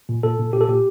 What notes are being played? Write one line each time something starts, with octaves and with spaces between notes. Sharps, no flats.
A#2
A#2 A4
A#2
A#2 G4
A4
A#2 G4